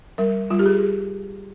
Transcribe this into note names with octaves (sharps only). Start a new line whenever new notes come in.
G3 A#4
G3 F4
G4
G#4